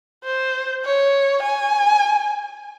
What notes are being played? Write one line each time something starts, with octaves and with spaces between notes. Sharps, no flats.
C5
C#5
G#5